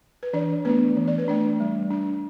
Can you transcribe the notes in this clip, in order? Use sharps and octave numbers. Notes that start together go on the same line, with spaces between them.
B4
E3 D4 D5
A3 B3 D4 B4
E3
D5
B4
A3 D4 D5
G3
D4